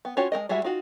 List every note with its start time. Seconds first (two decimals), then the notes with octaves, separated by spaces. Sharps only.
0.05 B3
0.17 C#4 F4 F#4 C#5
0.32 G#3 A3 A#4 D#5
0.49 G3 G#3 E4 F#4 E5
0.64 D#4 F4 F#4